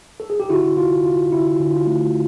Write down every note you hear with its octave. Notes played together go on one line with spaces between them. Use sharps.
A4
G#4
G4
D3 E4 F#4
D3 F4
D3 F4
D3 E4
D3
F4
A3